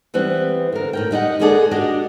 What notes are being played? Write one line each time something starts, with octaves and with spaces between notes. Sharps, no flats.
E3 G3 B3 C4
D3 A#4
A2 A#4 G5
G3 D#4 D#5 F#5
G#3 A#3 B3 G#4 A4 D5
D4 F#4 G4 D#5